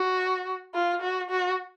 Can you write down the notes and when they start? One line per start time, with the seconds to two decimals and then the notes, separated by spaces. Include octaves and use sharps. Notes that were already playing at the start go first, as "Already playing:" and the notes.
Already playing: F#4
0.74 F4
1.02 F#4
1.30 F#4